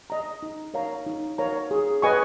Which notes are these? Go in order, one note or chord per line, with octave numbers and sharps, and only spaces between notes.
D#5 A#5
D#4
A#4 C#5 F5 A#5
D#4
A#4 C#5 F5 A#5
G#4
B4 D#5 G#5 C#6